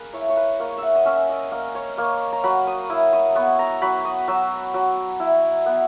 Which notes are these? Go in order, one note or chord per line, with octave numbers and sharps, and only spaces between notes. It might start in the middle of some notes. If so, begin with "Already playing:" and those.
Already playing: A#3 G#4 B4
E4 C#5
C#5
B4
A#3 C#5
E5 F#5
D#5
C#4 E5
D#5
A#3 D#5
C#5
A#3 C#5
A#5
F#3 B5
D#6
E4 D#6
D#6
B3 C#6
A#5
F#3 B5
D#6
F#3 E6
F#3
E4
B3